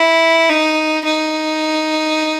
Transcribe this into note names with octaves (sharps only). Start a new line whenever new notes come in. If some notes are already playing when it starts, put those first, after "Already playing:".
Already playing: E4
D#4
D#4